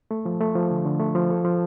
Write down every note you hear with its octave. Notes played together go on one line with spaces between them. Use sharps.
A3
F3
A3
F3
D3
D3
A3
F3
A4
F3